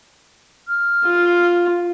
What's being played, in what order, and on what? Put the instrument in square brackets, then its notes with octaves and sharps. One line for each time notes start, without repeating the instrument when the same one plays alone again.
[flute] F6
[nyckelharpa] F4